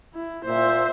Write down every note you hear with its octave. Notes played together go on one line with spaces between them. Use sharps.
E4
A#2 C5 E5